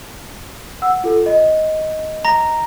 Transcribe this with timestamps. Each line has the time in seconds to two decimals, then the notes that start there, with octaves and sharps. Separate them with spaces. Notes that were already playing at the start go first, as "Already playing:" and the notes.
0.82 F#5 E6
1.04 F4 A4
1.26 D#5
2.25 A#5 A#6